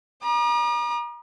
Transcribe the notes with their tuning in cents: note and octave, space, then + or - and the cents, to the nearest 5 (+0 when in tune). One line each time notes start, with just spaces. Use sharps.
A#5 +40 D#6 -45